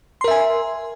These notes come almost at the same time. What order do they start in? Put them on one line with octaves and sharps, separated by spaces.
C6 A#4 E5 G#5